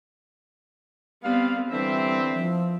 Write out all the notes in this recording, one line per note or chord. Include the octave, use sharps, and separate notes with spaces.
G3 B3 C4 F5
D3 E3 G3 C4 E5
F3